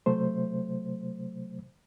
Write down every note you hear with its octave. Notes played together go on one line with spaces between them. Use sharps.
C3 F#3 A3 C5